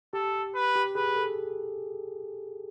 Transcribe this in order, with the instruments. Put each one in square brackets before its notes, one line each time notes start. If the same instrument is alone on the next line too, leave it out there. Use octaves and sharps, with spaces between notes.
[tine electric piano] G4 [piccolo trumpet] A4
[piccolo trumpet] B4
[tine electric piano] G4
[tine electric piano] G#4 [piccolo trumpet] B4
[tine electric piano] A4